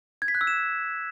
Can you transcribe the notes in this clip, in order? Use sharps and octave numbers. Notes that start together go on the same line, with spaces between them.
G#6
B6
F#6
E6
E7